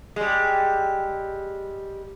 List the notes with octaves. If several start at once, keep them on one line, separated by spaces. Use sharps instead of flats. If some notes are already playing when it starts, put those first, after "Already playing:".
G3 G#3